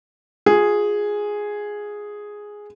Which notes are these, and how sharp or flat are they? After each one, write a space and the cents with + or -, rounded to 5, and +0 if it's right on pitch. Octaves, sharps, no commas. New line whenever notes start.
F4 +30 G#4 +0